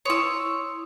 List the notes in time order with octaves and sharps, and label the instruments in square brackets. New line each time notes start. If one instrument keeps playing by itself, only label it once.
[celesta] E4 C6 D#6 [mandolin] C#5 E6